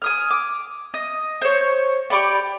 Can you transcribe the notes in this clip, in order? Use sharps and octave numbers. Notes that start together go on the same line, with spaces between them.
G#5 D#6 F6
D6
D#5
C5 C#5
G4 D5 B5 C#6